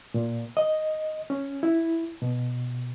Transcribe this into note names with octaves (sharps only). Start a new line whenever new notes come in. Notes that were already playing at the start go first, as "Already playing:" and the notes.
A#2
D#5
C#4
E4
B2